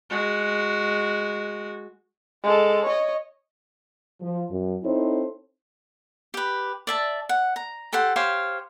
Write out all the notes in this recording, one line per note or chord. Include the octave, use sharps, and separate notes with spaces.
G#3 F#4
G#3 A4
C#5 D#5
F3
F#2
C4 D#4 E4 A4 C5 C#5
G4 B4
D5 E5 A5
F#5
A#5
G4 A4 C5 F#5
G4 C5 C#5 F5